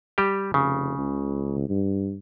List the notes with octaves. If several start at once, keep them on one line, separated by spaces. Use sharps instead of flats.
G3 G4
F1 C#3
C#2
G2